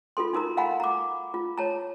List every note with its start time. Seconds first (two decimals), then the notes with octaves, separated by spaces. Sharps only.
0.17 F4 F#4 A4 C6
0.33 D#4 F#4 A#4 A#5
0.57 F5 F#5 G#5 A#5 B5
0.80 A#5 D6
1.34 F4
1.58 C#5 A5 A#5